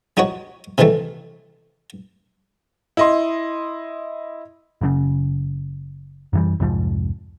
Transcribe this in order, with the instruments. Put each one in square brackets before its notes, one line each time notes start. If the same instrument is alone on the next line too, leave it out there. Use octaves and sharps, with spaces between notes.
[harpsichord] G3 D#4 F#4 C#5
C3 D#3 E3 G3 A3
[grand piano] E4 D#5 C6
[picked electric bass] F#1 F#2 C#3
F#2 E3 G3
C2 F2 G#2 F3